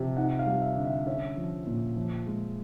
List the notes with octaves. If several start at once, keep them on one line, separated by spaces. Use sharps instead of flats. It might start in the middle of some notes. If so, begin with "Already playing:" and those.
Already playing: C3 F3
D#4 F#5
F5
G3
E5
D3
E5
C#4 E5
F3
A#2
F3
G#3